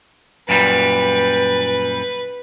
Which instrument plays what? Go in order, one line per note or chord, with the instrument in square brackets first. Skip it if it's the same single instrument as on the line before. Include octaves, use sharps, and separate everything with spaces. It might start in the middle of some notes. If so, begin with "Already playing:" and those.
[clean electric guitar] F#2 A#2 G3 [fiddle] B4